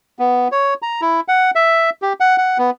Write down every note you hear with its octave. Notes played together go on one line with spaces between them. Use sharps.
B3
C#5
A#5
E4
F#5
E5
G4
F#5
F#5
B3